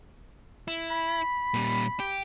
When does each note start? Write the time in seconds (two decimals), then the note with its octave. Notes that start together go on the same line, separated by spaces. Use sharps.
0.68 E4
0.90 B5
1.54 A#2 G3
2.00 G4